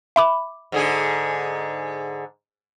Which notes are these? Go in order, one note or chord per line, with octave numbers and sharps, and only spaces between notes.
E5 B5 D6
G#2 D3 G#4